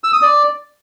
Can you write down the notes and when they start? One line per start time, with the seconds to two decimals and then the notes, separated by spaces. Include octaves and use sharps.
0.04 E6
0.13 D#6
0.22 D5